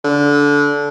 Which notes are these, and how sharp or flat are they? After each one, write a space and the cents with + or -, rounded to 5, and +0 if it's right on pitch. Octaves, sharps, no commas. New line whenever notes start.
D3 -20